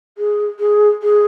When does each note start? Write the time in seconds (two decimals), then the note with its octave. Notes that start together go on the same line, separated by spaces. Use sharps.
0.17 G#4
0.59 G#4
1.02 G#4